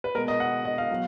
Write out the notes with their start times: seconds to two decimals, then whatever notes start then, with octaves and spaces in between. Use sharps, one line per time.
0.04 B4
0.15 B2 G#3 B3 A#4
0.28 D#5
0.40 F#5
0.65 D#5
0.78 F5
0.90 B2 F#3 B3